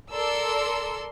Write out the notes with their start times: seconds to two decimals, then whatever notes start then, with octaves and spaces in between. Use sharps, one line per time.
0.13 A4 A#4 D5 C6 E6